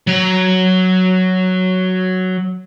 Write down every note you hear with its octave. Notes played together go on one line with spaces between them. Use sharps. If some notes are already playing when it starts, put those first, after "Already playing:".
F#3 A#5